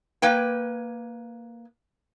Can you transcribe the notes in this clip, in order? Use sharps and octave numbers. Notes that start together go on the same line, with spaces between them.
A#3 B4 G5